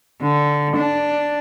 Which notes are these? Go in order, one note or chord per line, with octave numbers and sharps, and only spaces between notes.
D3
D4